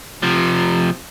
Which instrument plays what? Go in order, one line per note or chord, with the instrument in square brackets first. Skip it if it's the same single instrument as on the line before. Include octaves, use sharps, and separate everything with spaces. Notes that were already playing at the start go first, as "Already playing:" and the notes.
[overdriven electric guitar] C3 F3